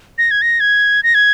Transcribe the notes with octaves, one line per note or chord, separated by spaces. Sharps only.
A#6
G#6
A#6
G#6
A#6
G#6